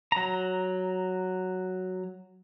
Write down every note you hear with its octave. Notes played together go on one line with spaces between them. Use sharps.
F#3 A#5